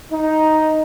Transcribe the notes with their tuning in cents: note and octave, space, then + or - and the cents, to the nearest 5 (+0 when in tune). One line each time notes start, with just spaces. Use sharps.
D#4 +5